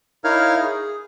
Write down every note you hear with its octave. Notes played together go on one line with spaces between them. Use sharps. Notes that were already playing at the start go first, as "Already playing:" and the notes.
D#4 E4 A#4 C#5 F5 F6
G#4